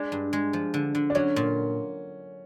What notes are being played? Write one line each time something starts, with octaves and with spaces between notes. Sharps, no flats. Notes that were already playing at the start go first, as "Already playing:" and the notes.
Already playing: G#3 D4
G2
G#3
F3
D3
D3
D4
F#3 C#4
A#2